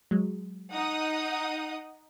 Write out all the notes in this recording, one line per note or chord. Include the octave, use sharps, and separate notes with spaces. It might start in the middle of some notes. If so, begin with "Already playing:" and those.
F#3 G#3
D#4 F#5 D#6